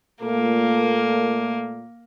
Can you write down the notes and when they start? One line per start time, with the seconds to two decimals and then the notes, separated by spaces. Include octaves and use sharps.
0.22 A#2 A3 A#3 A4